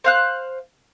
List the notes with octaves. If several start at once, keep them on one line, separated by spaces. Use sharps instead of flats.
C5 F5 F#6